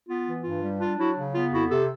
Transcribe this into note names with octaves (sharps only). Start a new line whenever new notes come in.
B3 F4
E3
G2 F4
G3
D4 F4
F#3 E4 F#4
C#3
B3 F4
F2 E4 F#4
C3 G4 A4